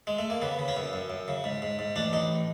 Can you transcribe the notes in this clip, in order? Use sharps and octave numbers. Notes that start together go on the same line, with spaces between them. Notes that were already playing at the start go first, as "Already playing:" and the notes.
G#3
A3
A#3
C#3 B3
C#3
C#4
F#2
F#2
F#2
C#3
G#2
G#2
G#2
A1 D4
A1 D#4